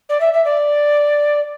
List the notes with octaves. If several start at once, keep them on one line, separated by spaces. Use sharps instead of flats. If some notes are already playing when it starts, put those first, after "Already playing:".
D5
E5
E5
D5